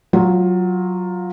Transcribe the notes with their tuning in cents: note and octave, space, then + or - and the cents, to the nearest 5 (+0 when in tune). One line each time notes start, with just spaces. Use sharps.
F#3 +0 F4 +15